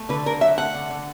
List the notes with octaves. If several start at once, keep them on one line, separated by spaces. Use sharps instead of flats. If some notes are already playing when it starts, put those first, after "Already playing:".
Already playing: A3
D3 B4
D3 A#4
F#3 E5
A3 F#5
D3
D3